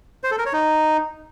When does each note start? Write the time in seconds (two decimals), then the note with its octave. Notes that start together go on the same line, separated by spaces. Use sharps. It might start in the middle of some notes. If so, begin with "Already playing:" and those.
0.24 C5
0.31 A4
0.38 A#4
0.46 C#5
0.53 D#4